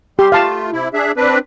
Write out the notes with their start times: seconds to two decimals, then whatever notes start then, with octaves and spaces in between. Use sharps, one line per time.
0.19 G3 G4 C6
0.32 A3 F4 F5 A5
0.72 C3 E4
0.94 D4 G#4 E5
1.17 C4 D4 B4